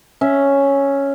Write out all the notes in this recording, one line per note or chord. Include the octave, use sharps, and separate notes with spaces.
C#4 E5